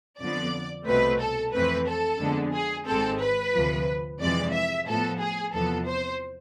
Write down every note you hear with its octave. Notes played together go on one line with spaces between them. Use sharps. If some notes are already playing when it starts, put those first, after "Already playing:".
F2 D3 F3 B3 D5
C2 B2 A3 C4 B4
A4
F2 E3 A3 C4 B4
A4
F2 D3 G#3 B3
G#4
G#1 G#2 G#3 C4 A4
B4
D2 C3 F3
F2 C3 E3 G#3 D5
E5
A2 F3 B3 A4
G#4
E2 C3 F3 B3 A4
C5